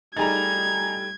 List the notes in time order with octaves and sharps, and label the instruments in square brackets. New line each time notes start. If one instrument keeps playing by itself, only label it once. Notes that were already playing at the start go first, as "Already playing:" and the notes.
[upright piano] G3 A3 A6 [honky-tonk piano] D#4 G#4 A#5 [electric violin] G#6